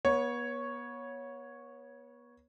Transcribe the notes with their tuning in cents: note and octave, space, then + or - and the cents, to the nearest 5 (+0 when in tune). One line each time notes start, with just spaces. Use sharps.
B3 -35 C#5 +0